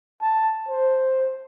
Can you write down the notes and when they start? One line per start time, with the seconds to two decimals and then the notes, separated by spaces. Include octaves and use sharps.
0.22 A5
0.69 C5